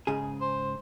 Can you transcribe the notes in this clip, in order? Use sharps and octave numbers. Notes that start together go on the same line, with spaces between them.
G#2 C#3 G#4
C5